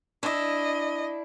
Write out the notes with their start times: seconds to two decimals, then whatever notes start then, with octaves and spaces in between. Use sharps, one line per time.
0.23 D4 E4 D#5